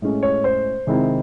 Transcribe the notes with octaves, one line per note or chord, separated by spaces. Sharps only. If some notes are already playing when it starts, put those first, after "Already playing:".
A2 G#3 C#4
C#5
C5
C3 D#3 G#3 C4 E4